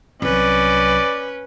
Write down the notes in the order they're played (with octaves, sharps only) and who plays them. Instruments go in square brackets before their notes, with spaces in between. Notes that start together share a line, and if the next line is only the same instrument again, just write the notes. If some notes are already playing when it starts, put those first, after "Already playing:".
[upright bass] C2 F#3 [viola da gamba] C#4 B4 [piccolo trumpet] D5